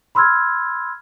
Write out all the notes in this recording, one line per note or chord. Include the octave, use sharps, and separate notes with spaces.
B5 C6 E6 F6 G#6